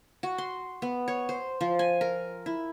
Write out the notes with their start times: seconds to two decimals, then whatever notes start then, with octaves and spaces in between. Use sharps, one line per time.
0.23 F#4
0.38 C6
0.82 B3
1.08 C#5
1.29 C5
1.61 F3
1.79 G#5
2.01 A#4
2.46 E4